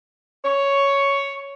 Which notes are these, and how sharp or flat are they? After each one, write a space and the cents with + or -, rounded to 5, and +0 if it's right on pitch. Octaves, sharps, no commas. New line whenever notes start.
C#5 +5